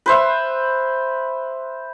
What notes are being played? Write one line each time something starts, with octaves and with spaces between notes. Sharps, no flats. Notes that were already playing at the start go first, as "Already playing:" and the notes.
B4 C5 E5